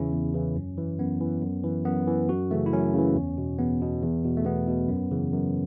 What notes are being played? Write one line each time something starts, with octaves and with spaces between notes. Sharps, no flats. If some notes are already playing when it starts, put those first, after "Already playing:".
Already playing: E2 C#3 E3 C#4 E4
E2
C#3 E3
F#2
E3
F#2 B3
E3
F#2
E3
F#2 B3
E3
F#2 F#4
C#3 E3 A3
E4
F#2 C#4
C#3 E3
E2
B2
E2 B3
B2
E2
B2
A3
E2 B3
B2
F#2
C#3 E3
F#2